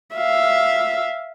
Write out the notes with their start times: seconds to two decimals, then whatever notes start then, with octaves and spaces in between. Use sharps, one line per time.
0.16 E5 F5